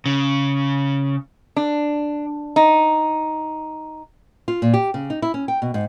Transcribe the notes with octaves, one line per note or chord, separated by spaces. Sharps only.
C#3
D4
D#4
F4
A#2
G4
C#3
D#4
E4
C#4
G5
B2
G#2